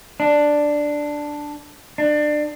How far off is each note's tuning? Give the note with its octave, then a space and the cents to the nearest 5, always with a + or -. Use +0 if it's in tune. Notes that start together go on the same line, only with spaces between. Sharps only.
D4 +5
D4 +25